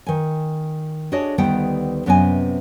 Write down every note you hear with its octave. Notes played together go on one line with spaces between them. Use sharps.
D#3 G#5
D4 F#4 G#4 A4 C#5 D#5
D2 D#3 G3 B3 F#5 G5
F#2 C3 B3 D#5 G5 G#5